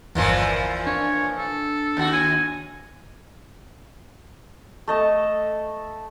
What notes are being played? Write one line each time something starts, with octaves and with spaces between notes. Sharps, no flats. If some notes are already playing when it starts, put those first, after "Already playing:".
G1 E2 A#2 E3 F3
D4 C#5
A4
D#2 F#4
G#5
A3 D#5 A5